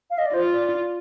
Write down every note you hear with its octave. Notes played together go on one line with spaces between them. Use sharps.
F5
D#5
D5
F4 C5
D5